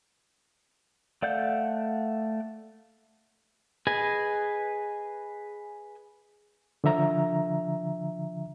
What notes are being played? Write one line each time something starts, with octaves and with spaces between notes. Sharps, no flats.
A3 D5 F5 F#5 G6
G#4 B4 D#5 G#5
D3 F3 E5 A#5